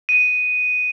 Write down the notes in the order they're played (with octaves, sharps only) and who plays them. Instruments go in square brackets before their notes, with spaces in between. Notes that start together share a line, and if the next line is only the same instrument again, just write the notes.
[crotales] D#7